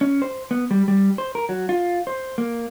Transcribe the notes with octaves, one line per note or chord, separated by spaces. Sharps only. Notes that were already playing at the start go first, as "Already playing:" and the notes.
C#4
C5
B3
G3
G3
C5
A#4
F#3
F4
C5
A#3